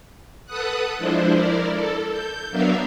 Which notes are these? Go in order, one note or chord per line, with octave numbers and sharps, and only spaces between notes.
A4 B4 F#5 D#6 F#6
F3 G#3 D4 E4 C5
E4 A#4 D5
A4
G6
F#3 B3 D4 A#4 E5 F5